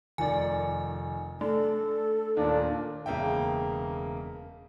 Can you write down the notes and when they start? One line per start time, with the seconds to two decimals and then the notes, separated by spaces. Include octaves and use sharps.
0.18 F1 D#3 D5 G#5
1.41 A3 D4 A4
2.37 D#2 A#2 D4
3.06 E1 C#3 A#3 E5 G5